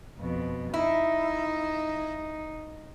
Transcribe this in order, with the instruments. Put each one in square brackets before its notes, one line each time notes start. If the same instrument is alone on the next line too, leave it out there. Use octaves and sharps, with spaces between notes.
[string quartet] F2 B2
[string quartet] D#4 [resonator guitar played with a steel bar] E4